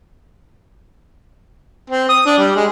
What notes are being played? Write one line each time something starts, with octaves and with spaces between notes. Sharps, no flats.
C4
D#6
D4
G3
G#3